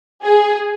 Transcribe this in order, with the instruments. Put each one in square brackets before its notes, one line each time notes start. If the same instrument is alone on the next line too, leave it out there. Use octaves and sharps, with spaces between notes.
[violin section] G#4